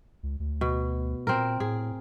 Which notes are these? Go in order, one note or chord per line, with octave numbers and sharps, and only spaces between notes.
C#2
D2
B2
A#2 C4 A#4
A2 G#4